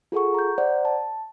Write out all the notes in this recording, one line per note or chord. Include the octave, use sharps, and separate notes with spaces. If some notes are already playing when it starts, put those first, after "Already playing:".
F4 G#4 A4 F#5 C#6
A#5 G6
C5 D5 F#5 A#5
A5